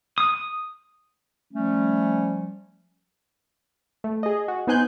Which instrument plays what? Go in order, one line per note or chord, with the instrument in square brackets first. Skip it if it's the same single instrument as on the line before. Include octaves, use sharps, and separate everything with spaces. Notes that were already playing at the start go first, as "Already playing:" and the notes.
[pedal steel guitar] D#6
[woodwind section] F3 G3 A3 C#4
[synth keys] A3
G#4 D#5
F#4
B3 D#4 C5 G#5 F#6 G6